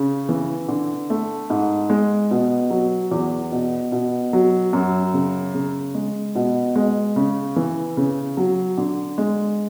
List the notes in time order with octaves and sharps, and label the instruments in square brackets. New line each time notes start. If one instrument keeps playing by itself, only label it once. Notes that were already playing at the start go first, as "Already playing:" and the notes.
Already playing: [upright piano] C#3
E3
D3
A3
G#2
G#3
B2
F#3
E2
B2
B2
F#3
F#2
C#3
C#3
G#3
B2
G#3
C#3
E3
C#3
F#3
D3
G#3